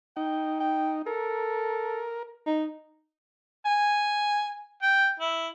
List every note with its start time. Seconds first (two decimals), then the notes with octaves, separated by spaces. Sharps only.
0.17 D#4 G5
0.60 G5
1.06 A4 A#4
2.46 D#4
3.66 G#5
4.83 G5
5.20 E4